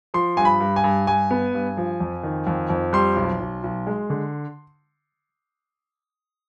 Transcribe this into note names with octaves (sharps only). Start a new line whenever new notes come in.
F3 C6
G2 G#5
B5
G2
G#5
G2
G2 G#5
B3
G2
F3
F2
D#3
F2
F2
G3 C6
B1
B1
B1
G#3
D3